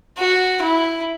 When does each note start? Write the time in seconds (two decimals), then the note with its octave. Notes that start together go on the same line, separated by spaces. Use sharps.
0.18 F#4
0.62 E4